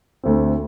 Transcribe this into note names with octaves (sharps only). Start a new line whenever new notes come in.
D2 D3 A3 C4